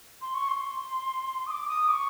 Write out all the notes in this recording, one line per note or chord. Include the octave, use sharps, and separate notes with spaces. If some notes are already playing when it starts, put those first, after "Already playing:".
C6
C#6
C6
D#6
D6
D#6
D6
C#6